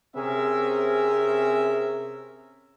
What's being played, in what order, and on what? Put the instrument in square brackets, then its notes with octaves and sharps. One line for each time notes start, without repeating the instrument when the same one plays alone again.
[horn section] C3 C4 C#4 G#4 A#4 E5